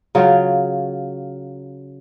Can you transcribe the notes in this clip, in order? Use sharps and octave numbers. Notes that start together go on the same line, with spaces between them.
C#3 F#3 F4